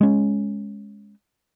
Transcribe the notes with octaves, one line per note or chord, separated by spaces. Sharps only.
G#3 C#4